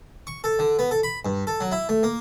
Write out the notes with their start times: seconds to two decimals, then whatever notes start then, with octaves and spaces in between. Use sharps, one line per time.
0.27 C#6
0.44 A4
0.59 D3
0.79 B3
0.91 A4
1.03 B5
1.25 G2
1.47 A4
1.60 F#3
1.72 E4
1.89 A3
2.03 A#3